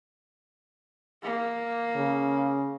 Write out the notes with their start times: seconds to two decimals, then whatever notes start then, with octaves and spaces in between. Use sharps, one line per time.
1.23 A#3
1.96 C#3